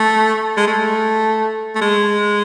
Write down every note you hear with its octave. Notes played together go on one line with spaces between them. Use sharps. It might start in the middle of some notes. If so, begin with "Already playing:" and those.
Already playing: A3
G#3
A3
A3
G#3